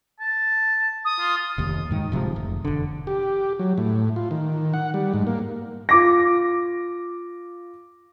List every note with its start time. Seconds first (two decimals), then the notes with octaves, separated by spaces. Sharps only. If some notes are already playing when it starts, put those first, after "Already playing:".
0.20 A5
1.05 D#6
1.20 F4
1.58 F1 D#2
1.90 G#2 D#3
2.12 D1 C3 F3 G#3
2.36 F1
2.65 E1 D3
3.07 G4
3.59 F#3
3.78 A2
4.16 F4
4.31 D#3
4.74 F#5
4.94 G3
5.14 G#2
5.27 A#3
5.89 F4 D6 A#6